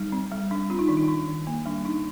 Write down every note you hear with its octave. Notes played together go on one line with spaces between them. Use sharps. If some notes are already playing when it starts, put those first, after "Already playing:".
Already playing: G3 D#4
C4
G3
G3 D4
C4 F4
D#4
D#3 D4
D#4
D4
D#3
A#3
G3 D4
D4 D#4